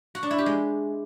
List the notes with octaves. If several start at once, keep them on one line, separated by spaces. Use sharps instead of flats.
F#4
D4
E4
G4
G#3